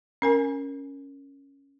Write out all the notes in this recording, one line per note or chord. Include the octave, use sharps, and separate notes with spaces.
C#4 A#4 G#5